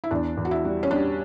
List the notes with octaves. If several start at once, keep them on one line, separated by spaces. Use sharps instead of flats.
E4
E2 D4
E2
F#4
E4
G3
C#4
G3 D4